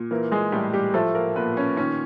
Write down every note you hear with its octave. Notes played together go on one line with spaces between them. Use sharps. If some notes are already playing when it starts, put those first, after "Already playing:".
Already playing: A#2
E3 A#3 A#4
G#3 G#4
A2 G3 G4
G3 G4
F3 A3 A4
A#3 A#4
A#2 B3 B4
C#4 C#5
D#3 C#4 C#5